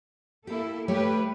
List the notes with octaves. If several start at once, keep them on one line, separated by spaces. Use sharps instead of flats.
A#3 E4 G4 A4
G3 A3 G4 B4 C#5